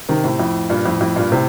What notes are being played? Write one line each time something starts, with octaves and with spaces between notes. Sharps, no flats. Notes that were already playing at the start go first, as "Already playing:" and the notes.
C3 D#3
A2 C3
F2 A2
G2 A#2
F2 A2
F2 A2
G2 A#2
A2 C3